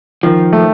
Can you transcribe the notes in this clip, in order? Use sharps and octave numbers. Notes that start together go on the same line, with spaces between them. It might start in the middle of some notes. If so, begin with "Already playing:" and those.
D#3 F3
A3